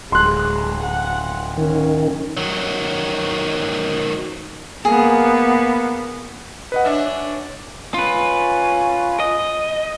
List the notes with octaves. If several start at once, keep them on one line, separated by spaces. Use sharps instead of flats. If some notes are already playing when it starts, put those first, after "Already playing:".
D1 G#3 C6 F#6
F#5
D#3 C#4
D#3 F#3
A#3 B3 G#4
B4 D#5 F#5
C#4 D4 E5
C#4 F4 B4
D#5